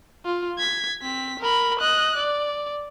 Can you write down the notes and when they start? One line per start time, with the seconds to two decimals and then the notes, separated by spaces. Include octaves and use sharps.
0.25 F4
0.58 G#6 B6
1.02 C4 B6
1.40 A#4 B5
1.80 D#5 F#6
2.17 D5